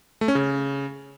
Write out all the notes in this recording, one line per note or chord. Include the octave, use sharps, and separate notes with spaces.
A3
C#4
C#3